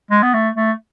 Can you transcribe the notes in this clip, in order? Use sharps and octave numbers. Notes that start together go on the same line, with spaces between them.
G#3
B3
A3
A3